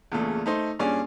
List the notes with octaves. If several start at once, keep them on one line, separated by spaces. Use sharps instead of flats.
E2 A#2 C#3 A3
A3 D#4 C5
G2 A#2 C#4 G#4 D5